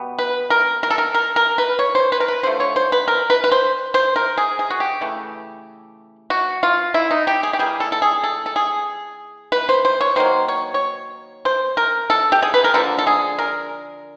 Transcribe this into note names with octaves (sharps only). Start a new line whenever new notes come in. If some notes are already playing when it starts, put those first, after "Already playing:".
Already playing: B2 G3 B3
B4
A#4
A#4
A4
A#4
A#4
A#4
B4
C#5
C5
B4
A#4
B4
D3 F3 A3 C5
C#5
C5
B4
A#4
B4
B4
C5
C5
A#4
G#4
G#4
F#4
G4
C#3 E3 A3
F#4
F4
E4
D#4
G4
G#4
G4
E3 G3 A#3 G#4
A4
A4
G#4
A4
A4
G#4
B4
C5
C5
C#5
D#3 F#3 A#3 C5
C#5
C#5
C5
A#4
A4
G4
G#4
B4
A#4
D3 F3 A#3 A4
A4
G#4
A#4